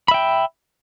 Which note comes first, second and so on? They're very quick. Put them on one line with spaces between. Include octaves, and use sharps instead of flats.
B5 E5 G5